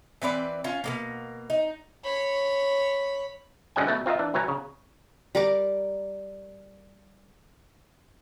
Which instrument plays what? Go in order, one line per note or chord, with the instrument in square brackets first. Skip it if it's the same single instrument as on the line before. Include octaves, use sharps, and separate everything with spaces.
[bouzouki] E3 C4 B4 D5
C#4 F4
B2 G#3 A#3
D#4
[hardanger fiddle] C#5 B5
[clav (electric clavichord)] F#2 D3 G#3 C#4 G5 G#5
B2 A3 B4
C4 F4 A#4 D#5 E5
E3 D4
C2 F#3 B4 C#5 G#5 A#5
C#3
[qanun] G3 A#4 D6